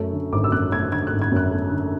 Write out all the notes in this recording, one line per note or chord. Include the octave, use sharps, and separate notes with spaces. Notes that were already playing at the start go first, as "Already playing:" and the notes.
Already playing: F#2 A3
D3
G#1 D6
E6
F#2 F#6
A3 G#6
D3 G#6
F#6
G#1
G#6
F#2 F#6
A3
D3